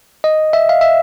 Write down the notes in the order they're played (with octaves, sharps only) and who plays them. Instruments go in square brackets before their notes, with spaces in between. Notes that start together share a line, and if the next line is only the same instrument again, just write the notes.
[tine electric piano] D#5
E5
F5
E5